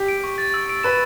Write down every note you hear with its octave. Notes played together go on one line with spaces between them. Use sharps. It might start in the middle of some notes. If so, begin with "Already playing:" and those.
Already playing: G4
D7
C#6
A6
E6
D7
B4 E7